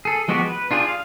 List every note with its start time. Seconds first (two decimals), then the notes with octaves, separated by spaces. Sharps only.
0.05 G#4 A4
0.28 F3 G#3 B3 F#4 G4
0.47 B4
0.71 D4 F4 G4 G#4
0.88 F5